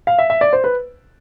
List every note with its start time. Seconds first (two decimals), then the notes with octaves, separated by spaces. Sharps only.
0.07 F5
0.19 E5
0.30 E5
0.41 D5
0.53 C5
0.64 B4